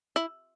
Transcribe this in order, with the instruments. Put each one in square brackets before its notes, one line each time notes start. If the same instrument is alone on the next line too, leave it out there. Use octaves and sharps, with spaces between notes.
[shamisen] E4